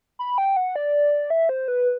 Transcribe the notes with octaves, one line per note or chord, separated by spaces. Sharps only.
B5
G5
F#5
D5
E5
C5
B4